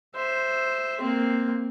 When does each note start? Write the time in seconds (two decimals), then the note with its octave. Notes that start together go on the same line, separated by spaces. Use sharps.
0.15 C5 E5
1.01 A#3 C4